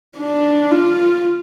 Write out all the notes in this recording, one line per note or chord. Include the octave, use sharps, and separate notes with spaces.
D4
F4